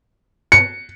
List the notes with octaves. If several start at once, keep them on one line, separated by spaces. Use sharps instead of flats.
C#7